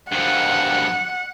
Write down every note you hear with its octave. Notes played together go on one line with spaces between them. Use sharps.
G2 F3 F#5